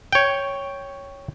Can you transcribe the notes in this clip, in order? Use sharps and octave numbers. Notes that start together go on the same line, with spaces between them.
C#5 G5